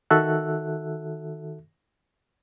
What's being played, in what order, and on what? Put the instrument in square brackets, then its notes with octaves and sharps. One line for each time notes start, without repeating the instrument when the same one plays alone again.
[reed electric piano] D#3 F#4 A4 E5 F#6